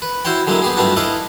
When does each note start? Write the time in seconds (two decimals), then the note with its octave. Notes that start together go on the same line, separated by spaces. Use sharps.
0.02 B4
0.25 E4 F#4 C5 C#5 G5
0.47 D3 F#3 G#3 A#3 E4
0.62 B3 G4 G#4
0.77 G2 A3 B3 D4 F4 F#4
0.97 E4 A4 B4 D5 D#5 F5